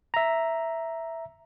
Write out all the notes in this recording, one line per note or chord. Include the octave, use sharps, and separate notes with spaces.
E5 A#5